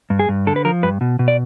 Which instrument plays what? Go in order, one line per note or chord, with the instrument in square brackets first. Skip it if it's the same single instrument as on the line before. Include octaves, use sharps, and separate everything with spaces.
[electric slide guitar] G2
G#4
G2
D3 A4
B4
F3 A#4
G2 B4
B2
B2
D5